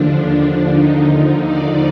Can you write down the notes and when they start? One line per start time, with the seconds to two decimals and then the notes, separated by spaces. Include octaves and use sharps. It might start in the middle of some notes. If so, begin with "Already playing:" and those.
Already playing: D#2 D3 F3 D4
0.70 D#2 D3 F3 D#4
1.44 D5